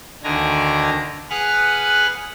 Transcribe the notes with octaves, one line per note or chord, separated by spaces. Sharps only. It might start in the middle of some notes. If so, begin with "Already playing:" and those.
D2 D3 D#3 D4 G#5 A#5
G#4 B4 F#5 G#5 F6 F#6